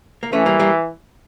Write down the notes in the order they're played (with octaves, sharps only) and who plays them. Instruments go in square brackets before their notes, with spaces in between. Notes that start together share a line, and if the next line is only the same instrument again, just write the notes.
[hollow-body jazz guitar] A#3
[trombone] E3 [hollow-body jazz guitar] A3 C#4
[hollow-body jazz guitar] G3 A#3
G3 A#3